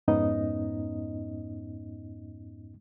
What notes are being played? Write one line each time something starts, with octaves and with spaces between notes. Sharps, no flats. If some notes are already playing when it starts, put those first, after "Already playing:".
F2 G#2 B3 C#4 D#4 D#5